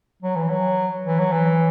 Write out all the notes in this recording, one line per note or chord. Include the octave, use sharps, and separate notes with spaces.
F#3
E3
F#3
E3
F#3
E3